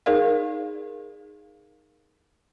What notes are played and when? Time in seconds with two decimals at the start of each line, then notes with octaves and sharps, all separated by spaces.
0.06 D#4 G#4 A#4 D5 F5